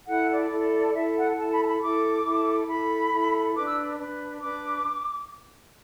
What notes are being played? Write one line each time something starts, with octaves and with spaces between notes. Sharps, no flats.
E4 A4 F#5
D5
E4 A4
E4 A4 E5
F#5
E4 A4 A5
B5
A5
B5
E4 A4 D6
E4 A4
E4 A4 B5
E4 A4
D4 B4 D6
E6
D4 B4
D4 B4 D6